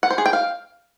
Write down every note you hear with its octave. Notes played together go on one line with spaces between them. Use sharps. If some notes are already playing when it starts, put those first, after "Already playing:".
F#5
C5
G#4
G5
F5